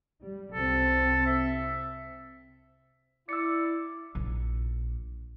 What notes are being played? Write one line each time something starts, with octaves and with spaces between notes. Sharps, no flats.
G3
C2 C4 A4
E5
E4 D5 E6 C#7
A#1